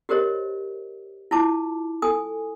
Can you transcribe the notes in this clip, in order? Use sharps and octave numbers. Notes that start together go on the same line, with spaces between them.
F#4 G4 A#4 C5 C#5 D#5
E4 F4 A5 D6
A4 G#5 D#6